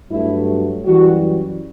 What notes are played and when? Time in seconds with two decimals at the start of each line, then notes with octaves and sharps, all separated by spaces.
0.11 G2 F#3 A3 E4
0.85 F#2 E3 G3 F#4